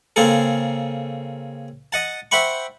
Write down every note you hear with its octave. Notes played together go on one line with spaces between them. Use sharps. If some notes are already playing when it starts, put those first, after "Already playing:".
C#3 A#3 C4 G#4 A4
D#5 F#5 A5
C5 E5 F#5 G5 B5 C#6